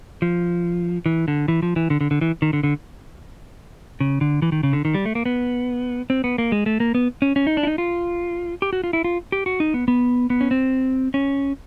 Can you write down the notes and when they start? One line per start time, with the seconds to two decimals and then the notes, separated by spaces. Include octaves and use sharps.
0.22 F3
1.06 E3
1.28 D3
1.48 E3
1.63 F3
1.76 E3
1.90 D3
2.01 D3
2.11 D3
2.21 E3
2.42 D#3
2.53 D3
2.63 D3
4.00 C#3
4.21 D3
4.42 E3
4.52 D#3
4.63 C#3
4.73 D3
4.85 D#3
4.94 G3
5.05 A3
5.15 A#3
5.26 B3
6.10 C4
6.24 B3
6.38 A#3
6.52 G#3
6.66 A3
6.80 A#3
6.95 B3
7.22 C#4
7.36 C#4
7.47 D#4
7.57 D4
7.63 E4
7.67 D#4
7.78 F4
8.62 G4
8.73 F#4
8.84 F4
8.93 E4
9.04 F4
9.32 G4
9.46 F#4
9.60 D#4
9.74 B3
9.88 B3
10.30 B3
10.41 C#4
10.51 C4
11.14 C#4